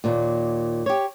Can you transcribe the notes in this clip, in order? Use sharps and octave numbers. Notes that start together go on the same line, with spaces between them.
D#2 A#2
G4 C#5